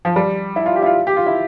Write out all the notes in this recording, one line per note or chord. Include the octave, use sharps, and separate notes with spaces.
F3
G3
E4
F4
G4
E4
F4
G4
F4
E4